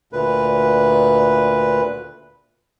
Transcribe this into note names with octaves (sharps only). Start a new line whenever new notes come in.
D2 A#2 B4